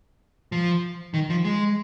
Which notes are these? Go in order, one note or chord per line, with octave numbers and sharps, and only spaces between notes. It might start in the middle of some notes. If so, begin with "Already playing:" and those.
F3
D#3
F3
G#3